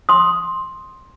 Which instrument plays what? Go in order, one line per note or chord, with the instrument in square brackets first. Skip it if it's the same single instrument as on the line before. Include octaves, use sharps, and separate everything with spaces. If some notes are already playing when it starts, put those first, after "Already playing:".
[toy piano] C6 D#6